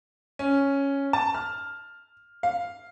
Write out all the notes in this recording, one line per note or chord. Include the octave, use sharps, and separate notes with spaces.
C#4
A5
F6
F5